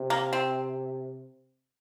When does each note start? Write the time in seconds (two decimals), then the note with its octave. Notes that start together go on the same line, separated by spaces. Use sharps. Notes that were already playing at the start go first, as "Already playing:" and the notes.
Already playing: C3
0.10 A#3
0.33 C4